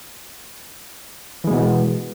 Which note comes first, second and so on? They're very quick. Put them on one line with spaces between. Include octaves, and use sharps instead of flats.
E3 G#3 B2 B3